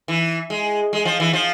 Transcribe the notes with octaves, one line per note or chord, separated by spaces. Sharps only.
E3
G#3
G#3
F3
E3
F3